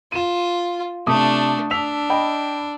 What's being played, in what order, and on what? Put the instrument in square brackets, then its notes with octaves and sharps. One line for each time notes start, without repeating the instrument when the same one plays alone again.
[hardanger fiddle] F4 [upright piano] D#7 E7
[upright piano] C3 D6 D#6 [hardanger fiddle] A3 D4
[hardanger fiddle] D4 [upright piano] E6 B6 F7
[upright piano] D#5 G5 B5